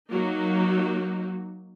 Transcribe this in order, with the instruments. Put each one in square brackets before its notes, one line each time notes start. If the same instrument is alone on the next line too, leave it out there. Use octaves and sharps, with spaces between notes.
[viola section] F#3 A#3 D#4 F#4